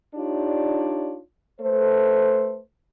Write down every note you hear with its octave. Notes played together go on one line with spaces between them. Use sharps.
D4 D#4 F4 G4 C#5 D5
A3 A4 B4 C5